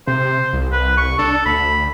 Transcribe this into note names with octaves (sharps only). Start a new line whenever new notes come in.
C3 C5
C2
B4
C#6
D4 A4
D2 B5